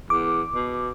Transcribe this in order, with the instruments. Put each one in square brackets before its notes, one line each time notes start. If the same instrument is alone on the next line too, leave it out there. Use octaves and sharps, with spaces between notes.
[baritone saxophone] E2 [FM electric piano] D6
[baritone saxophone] B2